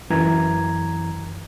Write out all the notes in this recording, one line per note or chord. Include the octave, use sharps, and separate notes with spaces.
F#2 E3 A#5 G#6